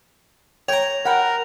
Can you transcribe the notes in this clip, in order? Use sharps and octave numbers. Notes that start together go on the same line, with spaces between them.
C#5 G5 A#5 F7
A#4 F#5 G5 B5